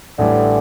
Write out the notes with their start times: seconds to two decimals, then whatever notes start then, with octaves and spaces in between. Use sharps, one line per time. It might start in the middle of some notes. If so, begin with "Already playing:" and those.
0.18 A1 A2 D3 E3 G3